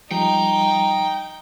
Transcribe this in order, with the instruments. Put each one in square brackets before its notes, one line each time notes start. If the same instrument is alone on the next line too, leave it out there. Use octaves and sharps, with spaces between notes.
[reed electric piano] F3 G3 [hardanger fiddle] D#4 [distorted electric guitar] G5